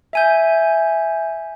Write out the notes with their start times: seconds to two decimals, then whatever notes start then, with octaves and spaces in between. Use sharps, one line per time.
0.13 E5 G#5 G6